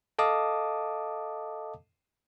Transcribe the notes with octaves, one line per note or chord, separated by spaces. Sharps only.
A4 D#5 F5 A5 D6 D#6